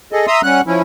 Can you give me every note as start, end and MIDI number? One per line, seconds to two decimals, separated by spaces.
0.12 0.26 68
0.12 0.26 69
0.12 0.26 75
0.27 0.41 76
0.27 0.41 82
0.27 0.41 84
0.27 0.41 87
0.27 0.41 88
0.43 0.61 55
0.43 0.61 61
0.43 0.61 78
0.43 0.61 90
0.67 0.82 53
0.67 0.82 61
0.67 0.82 64